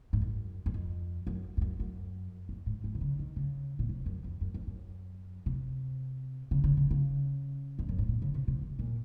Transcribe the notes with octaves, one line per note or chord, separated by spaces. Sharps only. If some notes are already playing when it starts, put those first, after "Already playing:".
G#2
F#2
F#2
F2
F#2
F2
F#2
F#2
F2
G#2
G#2
C3
C#3
D#3
C#3
A#2
C3
F#2
F2
F#2
F2
F#2
C3
C#3
C#3
C#3
C#3
F2
F#2
G#2
A#2
C#3
C3
C3
C3
A#2